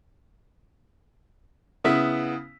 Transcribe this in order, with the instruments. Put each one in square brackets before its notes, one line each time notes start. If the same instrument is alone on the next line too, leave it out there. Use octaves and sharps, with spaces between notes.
[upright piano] C#3 B3 E4 B6